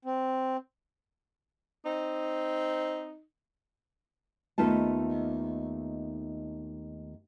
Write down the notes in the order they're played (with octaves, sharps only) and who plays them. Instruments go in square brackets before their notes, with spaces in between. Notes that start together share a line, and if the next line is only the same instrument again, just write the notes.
[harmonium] C4
[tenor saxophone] C4 [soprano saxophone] D#4
[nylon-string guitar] D#2 A3 B3 D#4 F4 A5